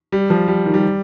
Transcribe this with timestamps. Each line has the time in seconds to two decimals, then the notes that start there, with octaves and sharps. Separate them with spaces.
0.12 G3
0.30 F3
0.48 G3
0.66 D#3
0.74 G3